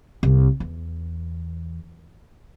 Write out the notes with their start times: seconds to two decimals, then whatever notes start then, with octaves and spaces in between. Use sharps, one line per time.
0.23 C2
0.60 E2